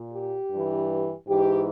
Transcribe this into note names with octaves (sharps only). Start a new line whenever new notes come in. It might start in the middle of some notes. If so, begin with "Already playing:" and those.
Already playing: A#2
G4
G2 E3
G#2 E3 G4